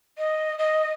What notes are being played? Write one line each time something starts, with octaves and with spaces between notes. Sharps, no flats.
D#5
D#5